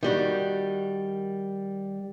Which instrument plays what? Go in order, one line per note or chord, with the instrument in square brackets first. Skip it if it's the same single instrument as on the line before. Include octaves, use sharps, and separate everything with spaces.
[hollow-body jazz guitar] D#3 G3 F#4